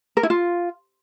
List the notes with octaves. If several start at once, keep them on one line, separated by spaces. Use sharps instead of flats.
A#4
E4
F4